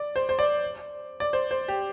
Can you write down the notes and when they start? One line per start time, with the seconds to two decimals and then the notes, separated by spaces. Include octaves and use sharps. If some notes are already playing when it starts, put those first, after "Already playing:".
Already playing: D5
0.16 C5
0.29 C5
0.39 D5
1.20 D5
1.33 C5
1.51 C5
1.68 G4